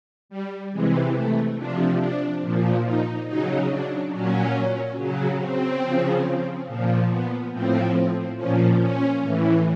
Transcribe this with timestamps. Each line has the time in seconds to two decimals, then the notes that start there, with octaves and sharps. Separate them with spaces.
0.29 G3
0.72 C3 E3 G#3
1.15 A3
1.56 C3 F3 D4
2.00 D4
2.42 A#2 F3
2.84 D#4
3.27 C#3 F#3 D#4
3.70 D4
4.12 A#2 F#3 C#4
4.96 C#3 F#3
5.39 C4
5.82 C#3 F3
6.67 A#2 F3
7.10 B3
7.52 A2 F3 C4
8.36 A#2 F3 C#4
8.80 C#4
9.22 A2 E3